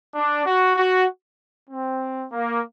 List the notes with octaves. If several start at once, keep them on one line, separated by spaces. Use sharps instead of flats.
D4
F#4
F#4
C4
A#3